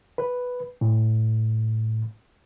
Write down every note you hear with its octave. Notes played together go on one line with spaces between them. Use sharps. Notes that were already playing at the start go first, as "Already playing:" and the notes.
B4
A2